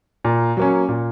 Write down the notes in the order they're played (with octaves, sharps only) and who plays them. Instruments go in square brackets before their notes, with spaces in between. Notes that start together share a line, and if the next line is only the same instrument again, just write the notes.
[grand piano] A#2
F#3 A#3 C#4
A#2